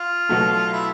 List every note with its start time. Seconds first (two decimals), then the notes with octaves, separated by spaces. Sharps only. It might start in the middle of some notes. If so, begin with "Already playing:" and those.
Already playing: F4
0.29 B2 F#3 A3
0.73 E4